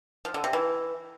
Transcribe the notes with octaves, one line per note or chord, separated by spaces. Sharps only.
F3
D3
C3
E3